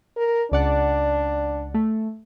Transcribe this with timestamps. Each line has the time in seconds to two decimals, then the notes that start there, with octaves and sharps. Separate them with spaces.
0.17 A#4
0.52 C#2 D4 D5 F#5
1.74 A3